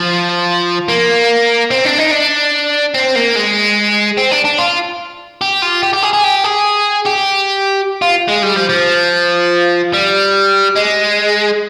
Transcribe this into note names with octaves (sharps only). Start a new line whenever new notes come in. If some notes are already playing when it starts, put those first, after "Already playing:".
Already playing: F3
A#3
C4
D4
D#4
D4
C4
A#3
G#3
C4
D4
D4
F4
G4
F4
G4
G4
G#4
G#4
G4
G#4
G4
F4
G#3
G3
F3
F3
G3
G#3